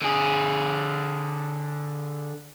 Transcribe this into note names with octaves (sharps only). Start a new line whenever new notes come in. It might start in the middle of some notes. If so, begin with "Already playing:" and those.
D3 G#4